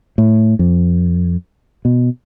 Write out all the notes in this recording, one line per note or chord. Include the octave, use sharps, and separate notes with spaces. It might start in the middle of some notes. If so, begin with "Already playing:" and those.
A2
F2
B2